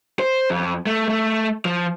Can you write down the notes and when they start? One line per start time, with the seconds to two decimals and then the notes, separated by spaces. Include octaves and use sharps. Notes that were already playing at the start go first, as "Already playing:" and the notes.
0.19 C5
0.50 F2
0.86 A3
1.09 A3
1.65 F3